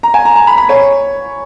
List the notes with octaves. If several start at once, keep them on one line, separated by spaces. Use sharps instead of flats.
A#5
G#5
A#5
A#5
B5
B5
C#5